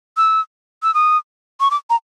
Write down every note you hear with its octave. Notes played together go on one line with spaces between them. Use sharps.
E6
E6
D#6
C#6
D6
A#5